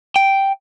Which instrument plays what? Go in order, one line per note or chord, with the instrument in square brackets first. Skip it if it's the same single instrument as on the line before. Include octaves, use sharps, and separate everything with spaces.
[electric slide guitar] G5